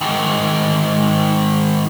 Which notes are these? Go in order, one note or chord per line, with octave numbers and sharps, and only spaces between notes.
G#2 D#3